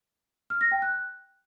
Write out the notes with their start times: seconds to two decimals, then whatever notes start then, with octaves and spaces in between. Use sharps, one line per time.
0.50 F6
0.61 A#6
0.72 G5
0.82 F#6